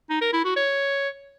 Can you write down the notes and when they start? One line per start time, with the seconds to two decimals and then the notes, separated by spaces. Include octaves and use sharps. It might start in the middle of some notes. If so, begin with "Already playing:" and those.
0.10 D#4
0.21 A#4
0.33 E4
0.45 F#4
0.56 C#5